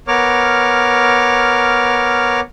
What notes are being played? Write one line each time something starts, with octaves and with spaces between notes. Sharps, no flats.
B3 A#4 C#5 D6 F6